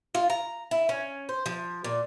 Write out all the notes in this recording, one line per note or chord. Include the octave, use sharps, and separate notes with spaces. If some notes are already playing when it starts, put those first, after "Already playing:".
F4
A#5
E4
C#4
C5
F3
A#2